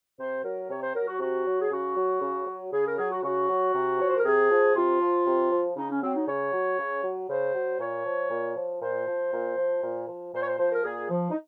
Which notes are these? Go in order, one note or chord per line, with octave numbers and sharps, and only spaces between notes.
C3 C5
F#3 A#4
C3 C#5
C5
F#3 A#4
F#4
C3 F#4
F#3
G#4
C#3 F#4
F#3
C#3
F#3
C#3 G#4
A#4
F#3 G#4
F#4
C#3 F#4
F#3
C3
F3 C#5
C5
A#4
C3 G#4
F3
C3 F4
F3
C3
F3
C#3 D#4
C#4
F#3 C4
D#4
C#3 C#5
F#3
C#3
F#3
C#3 C5
F#3
A#2 C#5
F3
A#2
F3
A#2 C5
F3
A#2
F3
A#2
F3
A#2 C5
C#5
C5
F3 C5
A#4
A#2 G#4
F3
D#4